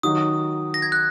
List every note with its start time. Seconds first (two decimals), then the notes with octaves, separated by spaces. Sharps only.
0.03 D#3 F#3 D#4 F#4 D#6
0.74 A#6
0.82 G#6
0.92 F#6